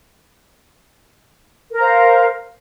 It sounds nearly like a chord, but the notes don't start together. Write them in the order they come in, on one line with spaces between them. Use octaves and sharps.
A#4 A#5 C5 F5